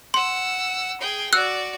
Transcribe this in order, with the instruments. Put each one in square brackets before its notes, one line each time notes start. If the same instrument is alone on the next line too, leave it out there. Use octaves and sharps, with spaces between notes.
[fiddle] F#5 E6 [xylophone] C6
[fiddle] G#4 G5
[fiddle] F#4 D5 [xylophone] E6 F#6